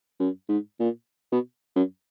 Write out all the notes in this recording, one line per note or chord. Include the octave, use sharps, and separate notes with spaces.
F#2
G#2
A#2
B2
F#2